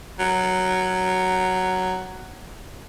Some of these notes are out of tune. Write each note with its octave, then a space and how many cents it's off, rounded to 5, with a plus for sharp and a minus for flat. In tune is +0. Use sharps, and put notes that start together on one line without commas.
F#3 +5